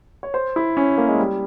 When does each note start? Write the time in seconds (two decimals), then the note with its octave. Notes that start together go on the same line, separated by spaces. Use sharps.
0.23 C#5
0.34 C5
0.56 E4
0.77 C#4
0.98 A#3
1.08 G#3
1.19 G3